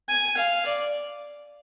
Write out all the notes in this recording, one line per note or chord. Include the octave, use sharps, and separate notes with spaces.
G#5
F5
D5